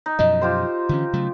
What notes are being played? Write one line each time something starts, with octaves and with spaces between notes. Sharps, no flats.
D#4
F#2 B2 F3 D#5
F4 G4 C5
D3 E3 C#4
C#3 F#3 A3